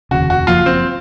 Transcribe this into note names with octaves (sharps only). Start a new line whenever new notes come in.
F1 D#2 C#3 F#4
F#4
F#1 F#2 F3 A#3 F4
C4